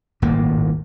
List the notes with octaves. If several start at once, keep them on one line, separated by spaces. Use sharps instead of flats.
D#1 G#1 A2 A#3